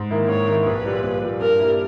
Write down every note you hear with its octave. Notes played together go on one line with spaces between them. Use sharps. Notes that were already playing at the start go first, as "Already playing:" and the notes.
Already playing: G#2
D#3 A#3 E4
G#2 C#5
D#3 A#3 E4
A#1 B4
A#2 G3
A#1
A#2 G3
G2 A#4
G3 A#3 E4